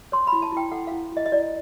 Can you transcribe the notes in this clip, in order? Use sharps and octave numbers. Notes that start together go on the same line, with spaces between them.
C#5 C6
B5
E4
A5
E4 G5
A4 F#5
E4 F5
E4 D#5
D#5
E4 D5